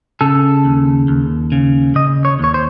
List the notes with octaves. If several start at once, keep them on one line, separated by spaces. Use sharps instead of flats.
C#3 A4
D#2
D#2
C#3
C#3 D#5
C#5
D#2 C#5
C5